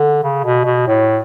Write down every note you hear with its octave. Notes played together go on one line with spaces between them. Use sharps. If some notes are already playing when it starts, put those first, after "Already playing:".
Already playing: D3
C#3
B2
B2
A2